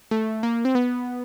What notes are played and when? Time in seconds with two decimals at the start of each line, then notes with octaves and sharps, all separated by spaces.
0.11 A3
0.43 A#3
0.65 C4
0.75 B3